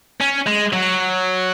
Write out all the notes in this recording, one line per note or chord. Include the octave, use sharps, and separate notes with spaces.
C#4
G#3
F#3